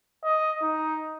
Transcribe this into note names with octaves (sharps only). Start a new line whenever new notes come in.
D#5
D#4